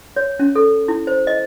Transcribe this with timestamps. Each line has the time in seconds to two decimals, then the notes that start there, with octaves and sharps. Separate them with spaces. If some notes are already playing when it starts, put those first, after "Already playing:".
0.16 C#5
0.39 C#4
0.56 A4
0.88 E4
1.07 C5
1.27 D#5